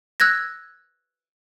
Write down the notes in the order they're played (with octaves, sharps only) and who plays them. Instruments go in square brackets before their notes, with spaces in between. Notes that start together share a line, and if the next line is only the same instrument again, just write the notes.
[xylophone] E6 F#6 G#6 A#6